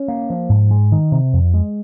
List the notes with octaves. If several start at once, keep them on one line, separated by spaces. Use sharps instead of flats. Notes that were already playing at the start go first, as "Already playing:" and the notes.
Already playing: C#4
A#3
F3
G#2
G#3
D#3
C3
F2
G#3